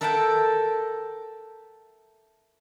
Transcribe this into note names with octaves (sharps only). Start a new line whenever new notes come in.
A4 A#4 E5 F#5 G5 A5